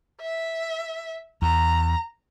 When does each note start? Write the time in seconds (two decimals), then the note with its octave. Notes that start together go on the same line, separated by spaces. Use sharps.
0.21 E5
1.42 E2 A#5